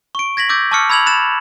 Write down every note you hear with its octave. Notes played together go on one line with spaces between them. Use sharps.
C#6 D7
G#6 A#6 B6 F#7
D6 E6 G6 A6
A5 C#6 D6 E6 F6 C#7
B5 E6 G#6 F7 F#7
B5 F#6 A6 E7